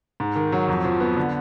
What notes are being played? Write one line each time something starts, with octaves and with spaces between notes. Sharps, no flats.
G#2
D#3
F#3
F2
F3
B3
D3